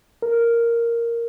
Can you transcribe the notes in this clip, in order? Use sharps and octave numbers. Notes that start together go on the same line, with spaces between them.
A#4